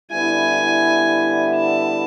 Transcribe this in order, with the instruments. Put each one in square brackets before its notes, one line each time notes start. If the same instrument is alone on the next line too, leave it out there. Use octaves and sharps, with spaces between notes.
[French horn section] D3 G3 B3 E4 [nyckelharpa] G#5
[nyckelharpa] A5